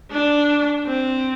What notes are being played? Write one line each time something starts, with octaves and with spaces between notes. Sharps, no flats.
D4
C4